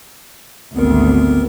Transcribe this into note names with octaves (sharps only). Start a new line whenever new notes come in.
G#1 D2 B3 C4 A#4